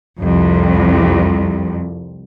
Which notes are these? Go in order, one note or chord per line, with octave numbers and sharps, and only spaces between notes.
C2 F2